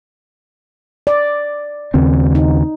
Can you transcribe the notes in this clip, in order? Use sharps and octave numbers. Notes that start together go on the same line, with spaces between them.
D5
D#2 C#3 C4
D#4